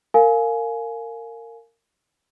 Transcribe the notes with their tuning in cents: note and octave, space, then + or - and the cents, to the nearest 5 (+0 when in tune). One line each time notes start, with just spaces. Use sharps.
A#4 -25 F5 +5 G#5 +15